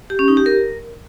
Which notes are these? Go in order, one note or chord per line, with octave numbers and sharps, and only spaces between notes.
G4
C#4
D#4
G4
A#4